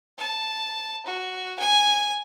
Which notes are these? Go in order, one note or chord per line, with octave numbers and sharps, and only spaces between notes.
A5
F#4
G#5